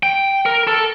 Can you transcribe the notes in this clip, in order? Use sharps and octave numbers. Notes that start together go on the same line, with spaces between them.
G5
A#4
A4